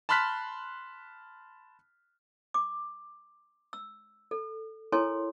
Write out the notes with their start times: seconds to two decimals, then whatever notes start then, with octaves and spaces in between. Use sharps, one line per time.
0.09 A5 B5 C6 F6 F#6 B6
2.54 D6
3.73 E6
4.31 A4
4.92 E4 A4 A#4 C#5 G#5 C6